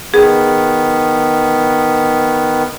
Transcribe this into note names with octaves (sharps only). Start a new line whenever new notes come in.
D#3 B3 G#4